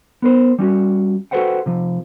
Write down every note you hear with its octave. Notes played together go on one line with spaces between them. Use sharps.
B3 A#4 C5
G3 C#4 F#4
F#4 A4 B4 C5 F#5 G5
C3 F3